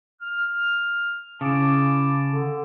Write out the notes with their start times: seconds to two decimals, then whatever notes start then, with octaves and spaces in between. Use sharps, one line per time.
0.21 F6
1.41 C#3 E4 A5 D6
2.31 D3